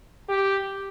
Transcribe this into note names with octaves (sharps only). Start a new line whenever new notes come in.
G4